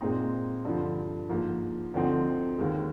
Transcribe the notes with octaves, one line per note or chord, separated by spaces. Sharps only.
A#2 G#3 C4 D#4
G2 D3 F3
G#2 F3 A#3
D2 D3 F3 C4 D#4
D#2 D#3 G#3